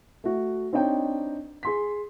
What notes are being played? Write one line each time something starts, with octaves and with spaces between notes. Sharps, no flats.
A3 F#4
C4 D4 D#4 C#5 G5
G#4 C6 B6